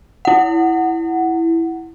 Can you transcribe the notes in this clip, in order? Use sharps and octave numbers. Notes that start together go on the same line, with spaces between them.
E4 F#5